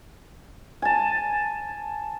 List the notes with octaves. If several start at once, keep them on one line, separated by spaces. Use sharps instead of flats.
G#5 A5